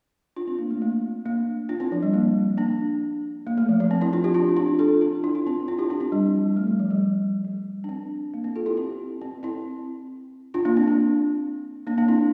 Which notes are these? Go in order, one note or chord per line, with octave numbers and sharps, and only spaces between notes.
D4 F4
C4
A#3
A3
A#3
A#3 D4
D4 F4
C4 E4
F3
G3
A#3
A#3 D4
A#3
A3
F3
F3
C4
C4 E4
D4 F4
E4 G4
D4 F4
D4 F4
F4 A4
D4 F4
E4
F4
C4 E4
D4 F4
E4 G4
D4 F4
C4 E4
G3
F3
A3
G3
F3
G3
G3
D4
C4
A#3
C4
F4 A4
E4 G4
C4 E4
C4
C4 E4
D4 F4
A#3 D4
C4
A#3 D4
A#3 D4
A#3 D4
C4 E4